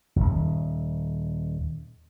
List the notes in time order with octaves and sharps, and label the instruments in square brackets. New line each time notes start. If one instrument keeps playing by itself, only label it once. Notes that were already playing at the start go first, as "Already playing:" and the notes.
[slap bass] D#1 G#1